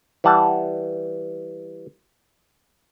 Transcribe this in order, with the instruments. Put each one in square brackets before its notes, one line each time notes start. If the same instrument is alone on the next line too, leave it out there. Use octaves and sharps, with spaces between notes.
[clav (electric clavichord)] E3 G3 F#5 A5